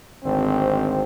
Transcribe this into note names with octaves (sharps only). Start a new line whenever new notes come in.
G#1 D2 C4